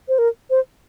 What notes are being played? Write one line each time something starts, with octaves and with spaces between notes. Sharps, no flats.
C5
A#4
C5